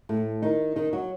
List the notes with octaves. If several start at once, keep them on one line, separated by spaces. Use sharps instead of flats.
A2 A3
D#3 D#4
D#3 D#4
F#3 F#4